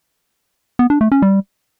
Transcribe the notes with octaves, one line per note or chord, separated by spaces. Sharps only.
B3
D4
A3
C#4
G3